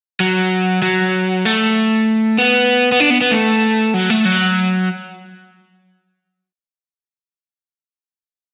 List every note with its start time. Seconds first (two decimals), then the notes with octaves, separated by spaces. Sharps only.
0.20 F#3
0.82 F#3
1.45 A3
2.38 B3
2.92 B3
3.00 D4
3.10 B3
3.21 B3
3.32 A3
3.94 F#3
4.10 A3
4.25 F#3